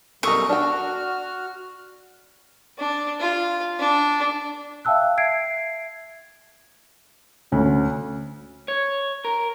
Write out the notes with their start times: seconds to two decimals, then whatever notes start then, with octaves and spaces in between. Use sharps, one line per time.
0.23 F#2 B2 G3 A4 A#4 C#6 D#6
0.49 D4 F#4 G5 F6
2.78 D4
3.20 F4
3.79 D4
4.85 E5 F5 G5 A5 E6 F#6
5.17 E5 G#6 C7 D7
7.52 D2 C#4
8.68 C#5
9.25 A#4